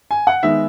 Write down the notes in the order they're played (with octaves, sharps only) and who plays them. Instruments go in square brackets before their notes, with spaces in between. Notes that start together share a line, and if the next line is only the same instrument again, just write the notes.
[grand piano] G#5
F#5
[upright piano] D#3 G#3 B3 D#4 [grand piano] E5